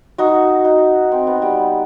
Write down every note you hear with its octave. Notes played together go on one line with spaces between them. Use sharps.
D#4 F#4
D#4
C4
B3
G3